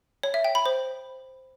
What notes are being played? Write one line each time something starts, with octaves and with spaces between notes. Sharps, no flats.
C#5
E5
G5
B5
C5